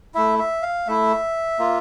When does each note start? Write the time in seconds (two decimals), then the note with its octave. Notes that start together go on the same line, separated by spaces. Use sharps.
0.15 A3 E4 E5
0.39 E5
0.62 F5
0.87 A3 E4 E5
1.59 A#3 F4